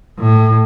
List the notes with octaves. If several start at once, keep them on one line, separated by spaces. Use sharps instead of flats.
A2